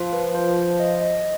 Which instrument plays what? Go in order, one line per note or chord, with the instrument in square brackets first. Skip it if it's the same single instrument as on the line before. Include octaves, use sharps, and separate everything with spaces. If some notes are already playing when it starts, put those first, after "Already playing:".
Already playing: [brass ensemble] F3 [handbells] F4
[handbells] B4
C5
C5
D#5
D#5